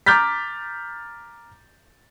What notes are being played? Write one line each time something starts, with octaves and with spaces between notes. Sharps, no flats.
A#5 D6 F6 G6 A6 B6